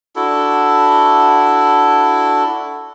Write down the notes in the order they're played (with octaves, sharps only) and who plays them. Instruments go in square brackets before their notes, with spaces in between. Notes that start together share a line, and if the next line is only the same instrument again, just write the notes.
[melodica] D4 E4 F#4 A4